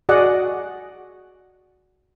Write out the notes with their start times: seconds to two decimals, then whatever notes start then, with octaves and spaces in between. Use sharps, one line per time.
0.09 F#4 G#4 D5 D#5 F#5